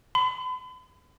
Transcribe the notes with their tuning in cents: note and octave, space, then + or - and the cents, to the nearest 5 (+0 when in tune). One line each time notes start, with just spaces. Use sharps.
B5 +45